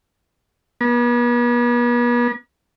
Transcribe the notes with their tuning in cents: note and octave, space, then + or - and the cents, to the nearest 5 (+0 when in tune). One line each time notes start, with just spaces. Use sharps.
B3 -40